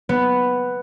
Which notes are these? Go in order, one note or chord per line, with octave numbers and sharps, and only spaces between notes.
B3